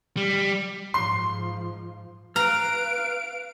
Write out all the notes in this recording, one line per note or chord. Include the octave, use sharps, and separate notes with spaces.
G3
G#2 F3 C6 C7
B4 F5 A#5 F6 D7